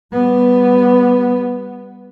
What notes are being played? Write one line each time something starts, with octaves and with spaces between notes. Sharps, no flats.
G3 B3